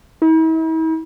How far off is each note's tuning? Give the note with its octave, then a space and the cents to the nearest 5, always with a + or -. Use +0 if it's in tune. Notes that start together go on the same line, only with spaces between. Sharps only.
E4 -45